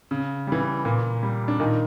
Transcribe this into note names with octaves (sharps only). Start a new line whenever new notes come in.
C#3
E3 G3
A#2
G3
D4
A#2 D#3 D#4